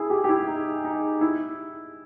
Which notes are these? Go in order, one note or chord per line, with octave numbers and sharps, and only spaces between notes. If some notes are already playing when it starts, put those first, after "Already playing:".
Already playing: E4 G#4
G4
G4
E4
D#4
D#4
E4